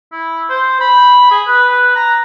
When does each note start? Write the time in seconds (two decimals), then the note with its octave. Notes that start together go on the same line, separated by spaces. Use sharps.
0.12 E4
0.49 C5
0.80 B5
1.31 G#4
1.48 B4
1.96 A#5